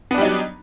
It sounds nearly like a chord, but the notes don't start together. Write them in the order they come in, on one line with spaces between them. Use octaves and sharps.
B3 D4 G3 D#4 F#3